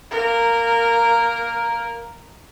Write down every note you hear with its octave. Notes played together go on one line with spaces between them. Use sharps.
A#3 A#4